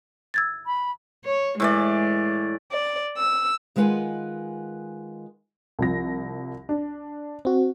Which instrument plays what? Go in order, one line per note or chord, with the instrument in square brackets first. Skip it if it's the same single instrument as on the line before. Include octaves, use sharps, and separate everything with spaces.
[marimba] E6 G#6 A6
[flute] B5
[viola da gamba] C#5
[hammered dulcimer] A2 E3 D5 [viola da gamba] G#3
[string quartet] D5
E6
[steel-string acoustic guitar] D#3 G#3 F4 B4 F#5 G#5
[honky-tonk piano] C2 F3 A#6
D4
[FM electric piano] C4 F#4